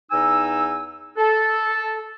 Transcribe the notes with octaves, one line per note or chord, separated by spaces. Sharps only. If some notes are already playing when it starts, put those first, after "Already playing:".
E2 D#4 G#5 E6
A4